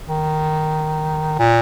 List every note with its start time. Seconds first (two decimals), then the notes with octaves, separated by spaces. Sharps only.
0.08 D#3
1.39 A#2